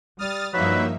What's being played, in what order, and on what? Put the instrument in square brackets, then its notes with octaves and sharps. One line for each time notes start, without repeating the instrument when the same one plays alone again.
[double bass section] G3 [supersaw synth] D#6 F6 A6
[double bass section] G2 F3 [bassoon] F#3 [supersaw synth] A#3 D#4 E5 [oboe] B4